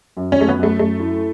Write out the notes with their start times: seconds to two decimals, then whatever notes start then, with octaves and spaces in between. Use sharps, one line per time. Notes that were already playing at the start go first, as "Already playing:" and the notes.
0.17 F#2
0.32 C#4
0.38 F#2 A3
0.49 B3
0.58 F#2 A3
0.79 F#2 A3
1.00 E4